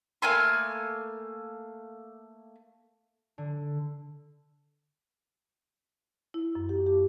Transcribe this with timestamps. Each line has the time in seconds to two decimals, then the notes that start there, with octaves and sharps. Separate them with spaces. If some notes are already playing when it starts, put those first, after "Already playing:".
0.22 A3 A#3 G#5 C6
3.38 D3
6.34 E4
6.55 F#2
6.69 G4
6.86 G4